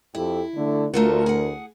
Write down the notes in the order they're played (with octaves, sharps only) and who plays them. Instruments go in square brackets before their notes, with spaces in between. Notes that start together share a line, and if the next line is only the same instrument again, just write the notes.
[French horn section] F2 G4 A4 [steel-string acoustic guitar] E4
[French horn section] D3 A3 D4
[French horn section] D2 A#4 [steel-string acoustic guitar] A3 F4 F#4
[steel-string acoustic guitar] G#4 F#5